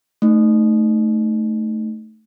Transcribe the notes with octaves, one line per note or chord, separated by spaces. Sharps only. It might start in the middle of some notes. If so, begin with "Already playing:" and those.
A3 D#4